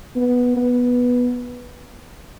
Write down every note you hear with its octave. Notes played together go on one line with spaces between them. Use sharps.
B3
B3